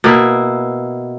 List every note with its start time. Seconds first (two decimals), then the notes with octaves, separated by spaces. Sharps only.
0.04 B2 A#3 E4